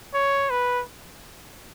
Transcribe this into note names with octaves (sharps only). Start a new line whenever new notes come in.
C#5
B4